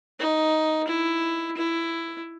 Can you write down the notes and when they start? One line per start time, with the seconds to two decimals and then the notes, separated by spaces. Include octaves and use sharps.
0.20 D#4
0.88 E4
1.57 E4